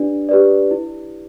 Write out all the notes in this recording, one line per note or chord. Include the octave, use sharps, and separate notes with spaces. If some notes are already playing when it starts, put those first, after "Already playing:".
Already playing: D4 G4 B4 D5
G4 B4 D5
E4